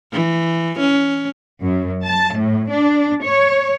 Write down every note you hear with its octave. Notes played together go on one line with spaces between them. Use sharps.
E3
C#4
F#2
A5
A2
D4
C#5